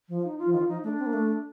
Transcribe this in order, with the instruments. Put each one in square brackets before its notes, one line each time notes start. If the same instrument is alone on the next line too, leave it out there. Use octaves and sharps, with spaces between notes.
[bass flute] F3
[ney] D#4
F4
[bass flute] F3
[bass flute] D#3 [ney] F4
[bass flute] F3 [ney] D#4
[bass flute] A3 [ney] D4
[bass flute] C4
A#3
A3